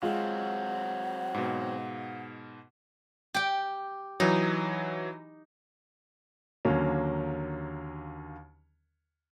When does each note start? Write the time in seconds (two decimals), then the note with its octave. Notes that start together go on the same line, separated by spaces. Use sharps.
0.03 F#3 G#3 C4 F4 F#5
1.34 G#2 B2
3.34 G4 G5
4.20 E3 F#3 D#4
6.65 D#2 D3 F#3 A#3 C#4